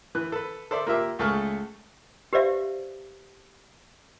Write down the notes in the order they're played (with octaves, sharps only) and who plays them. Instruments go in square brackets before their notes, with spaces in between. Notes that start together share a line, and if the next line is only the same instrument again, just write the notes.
[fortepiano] E3 B4 F#6
A4 B4
A4 C5 D5 E5
A#3 F4 G4 E5
C#2 A3 G#4 A4 C#6 F6
[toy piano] G4 B4 C5 D5 E5 F5